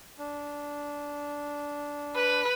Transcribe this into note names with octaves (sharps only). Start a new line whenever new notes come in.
D4
B4